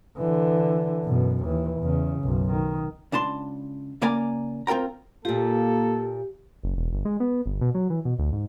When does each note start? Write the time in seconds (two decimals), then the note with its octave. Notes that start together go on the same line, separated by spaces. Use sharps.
0.17 D3 E3
1.04 F#2 B2
1.44 D#2 E3
1.80 E2 C#3
2.20 B1 F#2
2.51 D#3
3.12 C#2 D4 A5 C6
4.02 C#3 A#3 D5 G#5 A#5
4.67 C4 F4 A#4 G5 A#5
5.25 A#2 A#3 F4 G4 A4
6.63 F#1
6.76 E1
6.93 G1
7.05 G#3
7.20 B3
7.46 G1
7.61 B2
7.75 F#3
7.90 E3
8.05 B2
8.19 D2
8.33 G#2